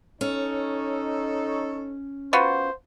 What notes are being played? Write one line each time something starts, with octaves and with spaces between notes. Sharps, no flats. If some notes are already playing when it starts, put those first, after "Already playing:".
C#4 D#4 A4 C#5
B3 F4 F#4 C5